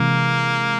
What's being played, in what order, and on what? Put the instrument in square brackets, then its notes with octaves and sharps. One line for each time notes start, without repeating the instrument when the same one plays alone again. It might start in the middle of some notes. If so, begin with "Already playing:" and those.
Already playing: [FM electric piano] C3 E3 G#3 [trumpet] A#3